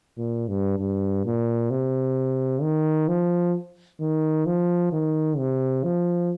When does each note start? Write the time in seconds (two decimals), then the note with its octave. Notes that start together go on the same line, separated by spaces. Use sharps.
0.18 A#2
0.48 G2
0.79 G2
1.25 A#2
1.70 C3
2.62 D#3
3.08 F3
4.00 D#3
4.46 F3
4.92 D#3
5.38 C3
5.84 F3